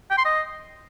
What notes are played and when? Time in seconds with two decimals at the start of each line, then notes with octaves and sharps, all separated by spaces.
0.11 G5
0.18 C6
0.25 D#5